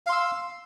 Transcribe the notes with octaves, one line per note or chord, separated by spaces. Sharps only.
F5 C6 E6